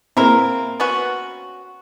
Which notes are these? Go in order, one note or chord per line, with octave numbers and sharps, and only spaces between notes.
A#3 C4 E4 A#4
B3 C#4 F#4